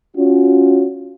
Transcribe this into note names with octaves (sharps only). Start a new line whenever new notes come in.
C#4 F4 F#4